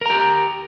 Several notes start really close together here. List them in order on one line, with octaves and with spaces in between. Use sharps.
A#4 A#5 G4